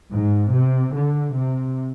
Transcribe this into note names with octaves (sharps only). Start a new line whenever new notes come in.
G#2
C3
D3
C3